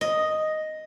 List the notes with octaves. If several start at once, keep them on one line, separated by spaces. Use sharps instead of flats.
D#5